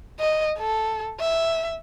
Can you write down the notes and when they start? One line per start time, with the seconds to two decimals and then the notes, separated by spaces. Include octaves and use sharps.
0.20 D#5
0.59 A4
1.20 E5